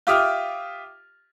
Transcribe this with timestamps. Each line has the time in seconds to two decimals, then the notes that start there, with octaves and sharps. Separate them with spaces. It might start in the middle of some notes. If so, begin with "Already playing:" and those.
0.07 F4 G4 E5 D6 D#6 F6